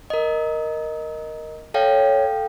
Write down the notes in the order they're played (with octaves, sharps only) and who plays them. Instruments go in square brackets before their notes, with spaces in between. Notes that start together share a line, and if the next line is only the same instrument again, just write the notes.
[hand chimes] A#4 D#5
[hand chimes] A4 F5 G5 [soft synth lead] C#5